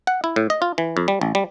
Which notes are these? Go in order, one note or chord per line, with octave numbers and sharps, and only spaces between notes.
F#5
E4
A2
D#5
F4
E3
F2
G3
A1
G3